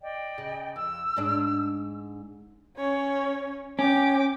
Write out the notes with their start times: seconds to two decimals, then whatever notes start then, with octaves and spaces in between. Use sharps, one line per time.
0.01 D5 D#5 G5
0.38 C#3
0.76 F2 E6
1.17 G#2 G#3 D4
2.77 C#4 C#5
3.79 C#4 G5 D6